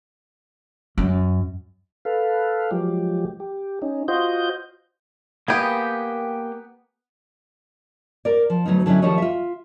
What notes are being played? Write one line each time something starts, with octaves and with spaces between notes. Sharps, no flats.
F#2
A4 B4 F5
F3 F#3 G#3 G4
G4
C#4 D#4
F4 F#4 C5 D#5 G6
A#3 B3 G4 G#4 G5
A#4 D5
F3
D2 F#3 B3 D#4
D3 F#3 C#4 D#4 E4
D#3 F3 G3 A4 C#5 D#5
F4 E5